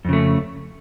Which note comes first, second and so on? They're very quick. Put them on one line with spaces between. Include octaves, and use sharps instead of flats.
F2 C#3 A3